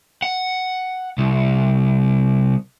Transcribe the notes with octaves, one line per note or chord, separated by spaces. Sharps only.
F#5
C2